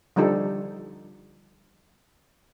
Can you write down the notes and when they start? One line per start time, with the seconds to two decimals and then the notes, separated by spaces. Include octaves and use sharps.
0.16 D3 F3 G3 D#4 A4